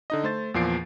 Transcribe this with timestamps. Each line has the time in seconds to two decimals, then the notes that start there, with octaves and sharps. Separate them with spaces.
0.10 D3 D#4 D#5
0.24 A3 C5 A6
0.54 E2 A#2 F3 C7 D7